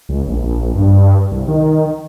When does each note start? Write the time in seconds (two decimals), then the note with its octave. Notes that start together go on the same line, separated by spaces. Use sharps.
0.09 C#2
0.28 A#1
0.75 G2
1.31 C2
1.48 D#3